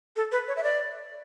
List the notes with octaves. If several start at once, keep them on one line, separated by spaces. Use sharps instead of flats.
A4
B4
C#5
E5
D5